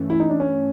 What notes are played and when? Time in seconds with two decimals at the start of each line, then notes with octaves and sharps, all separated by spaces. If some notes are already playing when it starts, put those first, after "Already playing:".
Already playing: G2 E3 A3 C#4
0.10 E4
0.20 D#4
0.30 D4
0.40 C#4